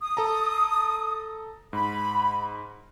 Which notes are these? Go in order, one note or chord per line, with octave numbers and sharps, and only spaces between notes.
D#6
A4 A5 A#5
G#2 B5